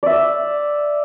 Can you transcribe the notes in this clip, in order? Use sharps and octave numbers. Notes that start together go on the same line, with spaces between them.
D5 E5